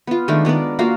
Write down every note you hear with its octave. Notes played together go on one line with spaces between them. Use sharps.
B3 F4
D#3 G#3 A3 D4
G#3 B3 A#4 D5
A#3 F4 F#4 F5